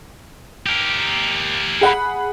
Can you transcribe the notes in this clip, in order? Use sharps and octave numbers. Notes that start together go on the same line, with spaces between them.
G4 A#4
G#4 F#5 B5